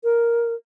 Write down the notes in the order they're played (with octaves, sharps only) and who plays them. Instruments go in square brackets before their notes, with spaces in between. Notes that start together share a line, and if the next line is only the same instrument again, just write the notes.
[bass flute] A#4